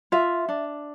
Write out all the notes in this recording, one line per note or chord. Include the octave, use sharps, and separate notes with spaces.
F4 E5
D4